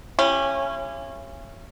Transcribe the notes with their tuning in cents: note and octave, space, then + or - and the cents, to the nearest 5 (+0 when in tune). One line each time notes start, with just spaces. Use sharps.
C#4 -15 E4 +40 G4 +0